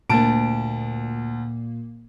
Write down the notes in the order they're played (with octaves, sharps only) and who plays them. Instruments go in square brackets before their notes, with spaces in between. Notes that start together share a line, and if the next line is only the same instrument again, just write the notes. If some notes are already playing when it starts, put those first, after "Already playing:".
[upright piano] D2 A5 D7 [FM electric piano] A#2 A#3